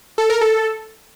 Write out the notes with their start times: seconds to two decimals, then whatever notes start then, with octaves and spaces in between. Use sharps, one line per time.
0.18 A4
0.30 A#4
0.41 A4